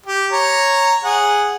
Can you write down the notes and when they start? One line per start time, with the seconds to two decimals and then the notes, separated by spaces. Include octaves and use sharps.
0.06 G4
0.32 C#5 A#5
1.04 G#4 F#5